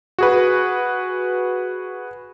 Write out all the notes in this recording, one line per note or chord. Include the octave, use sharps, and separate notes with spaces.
F#4 G#4 B4